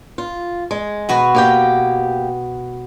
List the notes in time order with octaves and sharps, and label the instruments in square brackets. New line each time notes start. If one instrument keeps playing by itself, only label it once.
[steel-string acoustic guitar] F4
G#3
[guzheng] B2 F#4 B4
[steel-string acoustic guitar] A#3 G4 G5